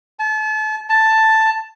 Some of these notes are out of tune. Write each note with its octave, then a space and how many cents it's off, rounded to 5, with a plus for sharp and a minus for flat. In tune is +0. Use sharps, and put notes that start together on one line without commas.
A5 -35
A5 +5